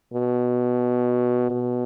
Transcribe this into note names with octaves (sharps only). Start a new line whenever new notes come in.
B2
B2